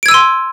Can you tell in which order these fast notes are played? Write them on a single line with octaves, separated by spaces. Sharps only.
D7 G#6 E6 D#7 C6